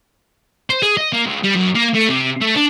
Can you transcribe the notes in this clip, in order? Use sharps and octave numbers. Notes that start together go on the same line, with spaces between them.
C5
G#4
D#5
A#3
C#2
G3
F#2
A#3
A3
C3
A3
D4